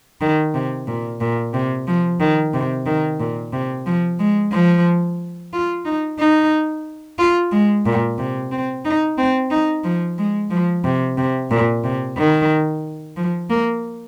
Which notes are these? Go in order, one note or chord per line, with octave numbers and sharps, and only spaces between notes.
D#3
C3
A#2
A#2
C3
F3
D#3
C3
D#3
A#2
C3
F3
G#3
F3
F4
D#4
D#4
F4
G#3
A#2
C3
C4
D#4
C4
D#4
F3
G#3
F3
C3
C3
A#2
C3
D#3
F3
A#3